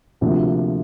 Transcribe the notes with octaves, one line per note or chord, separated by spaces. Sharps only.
D2 C3 F3 A#3 D4